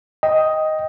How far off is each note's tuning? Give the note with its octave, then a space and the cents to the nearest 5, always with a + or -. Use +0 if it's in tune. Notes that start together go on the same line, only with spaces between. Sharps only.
D#5 +5 G5 +0